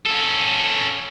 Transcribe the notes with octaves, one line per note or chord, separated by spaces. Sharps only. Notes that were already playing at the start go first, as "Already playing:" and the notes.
C#4 A4